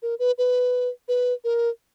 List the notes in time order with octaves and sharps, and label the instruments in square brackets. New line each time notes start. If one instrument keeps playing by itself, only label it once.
[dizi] A#4
B4
B4
B4
A#4